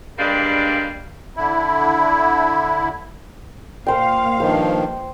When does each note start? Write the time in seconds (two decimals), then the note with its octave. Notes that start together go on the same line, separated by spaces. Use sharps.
0.18 G2 G3 G#3 A#3 D4 F5
1.37 D3 E4
3.87 A#2 C5 F5 G5
4.40 G2 D#3 F3 C5